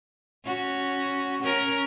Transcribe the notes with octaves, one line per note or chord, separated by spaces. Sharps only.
C#4 F#4
C#4 A#4